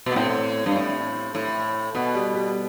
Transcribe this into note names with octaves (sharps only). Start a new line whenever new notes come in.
B2
B3
A2 C4
G2
A2
A2
B2 B3
G3
G3